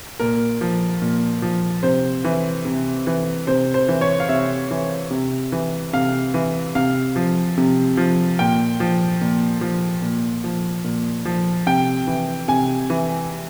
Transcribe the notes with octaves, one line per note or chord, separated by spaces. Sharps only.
A#2 A#4
F3
A#2
F3
C3 C5
E3
C3
E3
C3 C5
C5
E3
C#5
F5
C3 E5
E3
C3
E3
C3 F5
E3
C3 F5
F3
C3
F3
A#2 G5
F3
A#2
F3
A#2
F3
A#2
F3
C3 G5
E3
C3 G#5
E3